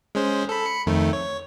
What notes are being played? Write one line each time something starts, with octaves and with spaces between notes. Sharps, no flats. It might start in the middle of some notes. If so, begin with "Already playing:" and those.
G#3 C#4 C5
A4 B5
B5 C#7
F2 D#3 A3
C#5